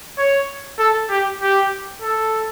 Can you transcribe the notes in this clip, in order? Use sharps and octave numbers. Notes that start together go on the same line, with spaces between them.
C#5
A4
G4
G4
A4